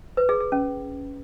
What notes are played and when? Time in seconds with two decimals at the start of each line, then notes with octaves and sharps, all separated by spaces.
0.17 B4
0.29 G#4
0.40 G#4
0.52 C#4